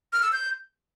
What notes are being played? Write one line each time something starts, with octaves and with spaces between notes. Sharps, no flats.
F6
E6
G6